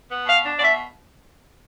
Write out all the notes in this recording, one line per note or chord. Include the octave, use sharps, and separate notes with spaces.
B3
B2 F5
D4
D5
B2 E5